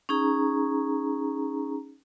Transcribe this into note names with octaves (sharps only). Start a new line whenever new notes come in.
C#4 D#4 G#4 A#5